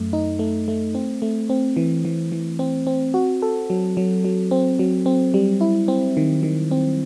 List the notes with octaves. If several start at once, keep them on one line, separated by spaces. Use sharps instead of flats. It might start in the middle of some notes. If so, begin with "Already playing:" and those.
Already playing: F#2 A3
D#4
A3
A3
C4
A3
C4
E3
E3
E3
C4
C4
F#4
A4
F#3
F#3
F#3
C4
F#3
C4
G3
E4
C4
D#3
D#3
C4